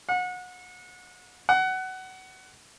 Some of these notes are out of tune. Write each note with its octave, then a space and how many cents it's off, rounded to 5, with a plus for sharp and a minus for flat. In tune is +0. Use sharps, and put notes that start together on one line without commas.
F#5 -30
F#5 +20